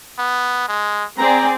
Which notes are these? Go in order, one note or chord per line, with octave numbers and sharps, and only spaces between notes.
B3
G#3
C4 G#4 D5 A#5